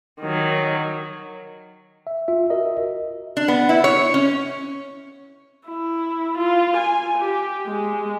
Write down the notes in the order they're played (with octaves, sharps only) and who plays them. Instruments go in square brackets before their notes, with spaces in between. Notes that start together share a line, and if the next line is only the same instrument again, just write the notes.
[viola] D#3 F#3
[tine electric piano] E5
F4 E5
F#4 A#4 D#5 E5
[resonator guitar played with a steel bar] D4
B3
E4
C#5
C#4
[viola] E4
F4
G#5
G4
G#3